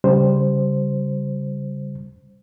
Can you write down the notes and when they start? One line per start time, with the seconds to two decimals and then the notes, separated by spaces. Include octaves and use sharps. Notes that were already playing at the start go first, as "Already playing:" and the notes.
0.04 C#3 G3 C5